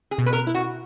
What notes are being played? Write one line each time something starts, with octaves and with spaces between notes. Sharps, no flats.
G#4
B2
B4
A#4
E4
F#4